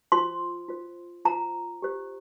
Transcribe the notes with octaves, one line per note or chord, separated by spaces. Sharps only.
F4 C5 C6
F4 C5
F4 C5 A#5
G4 C5